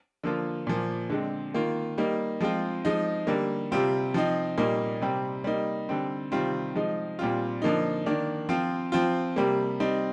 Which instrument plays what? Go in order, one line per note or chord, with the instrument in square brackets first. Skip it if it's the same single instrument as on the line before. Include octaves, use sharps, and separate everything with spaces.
[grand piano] D3 F3 A#3 F4
A#2 F3 A#3
D3 G#3 C4
D#3 A#3 F4
G3 A#3 D#4
F3 G#3 C4 F4
F3 G#3 D#4
D3 G3 A#3
C3 G3 C4 F4
F3 C4 D#4
A#2 G3 A#3 D#4
C3 G3 C4
G3 A#3 D#4
D3 G3 C4
C3 D#3 G3 C4 F4
F3 G#3 D#4
A#2 G3 C4 F4
D3 F3 A#3 D#4
D#3 A#3 D4
F3 C4 F4
F3 C4 F4
C3 G3 A#3
G3 C4 D#4